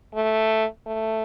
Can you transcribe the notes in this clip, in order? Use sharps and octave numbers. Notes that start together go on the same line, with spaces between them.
A3
A3